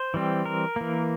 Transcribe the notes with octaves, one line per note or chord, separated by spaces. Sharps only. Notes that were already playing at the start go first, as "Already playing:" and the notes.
Already playing: C5
E3 G3 C4
A#4
E3 A#3